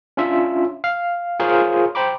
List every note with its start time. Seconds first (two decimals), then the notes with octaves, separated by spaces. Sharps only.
0.17 C#4 D4 F4 E5
0.84 F5
1.40 F4 G#4 A#4 C5 C#5 F5
1.95 C5 G5 A#5 B5 D6